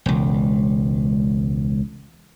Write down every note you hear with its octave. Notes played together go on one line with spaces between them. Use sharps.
E1 C#2